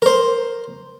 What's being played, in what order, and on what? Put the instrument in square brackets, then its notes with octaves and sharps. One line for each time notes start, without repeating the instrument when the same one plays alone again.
[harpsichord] A#4 C5